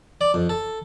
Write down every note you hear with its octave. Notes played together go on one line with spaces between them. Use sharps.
D5
F2
A4